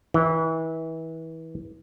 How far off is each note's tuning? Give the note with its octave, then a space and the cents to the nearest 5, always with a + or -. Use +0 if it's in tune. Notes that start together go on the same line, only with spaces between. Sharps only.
E3 -30